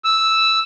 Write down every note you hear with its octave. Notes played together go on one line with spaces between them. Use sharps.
E6